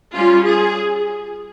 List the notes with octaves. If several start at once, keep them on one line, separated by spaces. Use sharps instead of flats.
G3 C#4 F4
G#4